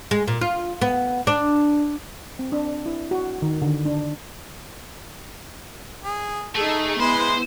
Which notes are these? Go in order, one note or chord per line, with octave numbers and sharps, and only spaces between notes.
G#3
A#2
F4
B3
D4
C4
D4
E4
F#4
D#3
D3
D4
G#4
A3 D#4 G#4 A4
G#3 B3 E4 B4 C5 C6